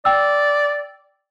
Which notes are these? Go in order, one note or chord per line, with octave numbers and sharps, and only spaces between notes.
D5 G5 E6